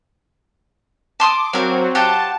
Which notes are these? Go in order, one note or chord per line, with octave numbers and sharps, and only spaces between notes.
A5 C6 D6 D#6
F#3 C4 A#4 F5
F4 G4 F#5 A5